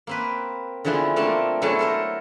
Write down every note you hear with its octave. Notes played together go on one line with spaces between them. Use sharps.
A#3 C4 B4
D3 E3 F3 G#3 B3 C4
A3 A#3 C4 D4 A#4 A5
B2 F#3 G#3 A3 E4 A5
A4 A#4 C5